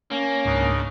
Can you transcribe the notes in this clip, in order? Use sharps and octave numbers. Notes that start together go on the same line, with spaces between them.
A#3 C#4
C#2 G#2 C#3 D4 D#4 C#6